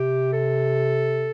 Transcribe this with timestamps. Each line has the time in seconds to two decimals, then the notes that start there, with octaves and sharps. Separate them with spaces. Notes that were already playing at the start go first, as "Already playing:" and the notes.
Already playing: C3 G4
0.32 A4